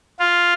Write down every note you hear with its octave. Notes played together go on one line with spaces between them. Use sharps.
F4